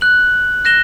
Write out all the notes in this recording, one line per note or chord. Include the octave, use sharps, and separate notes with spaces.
F#6 F#7
F#6 A#6 E7 G7